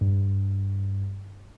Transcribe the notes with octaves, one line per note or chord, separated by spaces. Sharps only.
G2